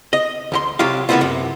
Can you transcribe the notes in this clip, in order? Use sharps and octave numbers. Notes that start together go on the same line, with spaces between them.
D#5
D2 G4 C6
C2 F#3 F4 G4 F5
C3 E3 A#3 B3 E4 F4
F#2 C3